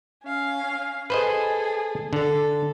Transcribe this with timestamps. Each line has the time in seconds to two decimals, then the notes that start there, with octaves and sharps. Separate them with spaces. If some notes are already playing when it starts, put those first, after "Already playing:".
0.24 C#4 F5
1.10 G#4 A4 B4 C5 D#5
2.13 D3 A4